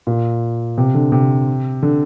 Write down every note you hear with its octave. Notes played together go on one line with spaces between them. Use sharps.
A#2
C3
D3
C3
D3